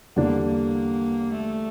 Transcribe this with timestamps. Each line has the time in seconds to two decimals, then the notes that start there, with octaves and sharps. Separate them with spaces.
0.16 E2 D3 G3 A#3 D4
0.46 A#3
1.37 A3